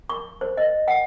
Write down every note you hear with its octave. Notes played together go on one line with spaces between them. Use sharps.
C#6
C5
D#5
F#5